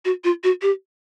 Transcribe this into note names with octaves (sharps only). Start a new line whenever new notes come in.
F#4
F4
F#4
G4